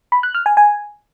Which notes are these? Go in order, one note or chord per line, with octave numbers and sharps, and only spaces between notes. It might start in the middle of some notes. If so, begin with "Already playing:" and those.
B5
F#6
F6
G#5
G#5